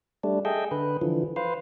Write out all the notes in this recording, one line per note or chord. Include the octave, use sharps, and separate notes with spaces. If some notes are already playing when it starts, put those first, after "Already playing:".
G3 A3 D4
G#4 A4 D#5 E5 G5
D3 B4
D3 E3 F3
B4 C5 F5